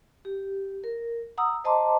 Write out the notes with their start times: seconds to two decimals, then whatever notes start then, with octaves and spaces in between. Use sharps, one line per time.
0.25 G4
0.84 A#4
1.38 F#5 A#5 D#6 E6
1.64 C5 D#5 A5 A#5 C6 D6